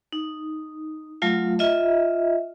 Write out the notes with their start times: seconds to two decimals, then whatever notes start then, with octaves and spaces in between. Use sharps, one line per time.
0.13 D#4
1.22 F#3 A3 F4 F5
1.59 F4 D#5 E5